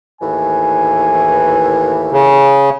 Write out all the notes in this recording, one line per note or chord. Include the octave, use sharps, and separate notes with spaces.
D#2 A2 E3 G#5
C#3